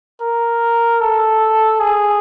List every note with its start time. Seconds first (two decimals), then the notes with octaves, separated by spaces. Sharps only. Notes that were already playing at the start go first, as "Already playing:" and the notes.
0.21 A#4
1.01 A4
1.80 G#4